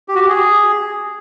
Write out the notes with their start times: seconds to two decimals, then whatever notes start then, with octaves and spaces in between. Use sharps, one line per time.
0.08 G4
0.15 F#4
0.22 G4
0.29 G#4